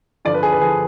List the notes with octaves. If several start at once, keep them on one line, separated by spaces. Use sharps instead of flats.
G2 D3 F3 D5
B4
G#4
B4
D3 F3 G#4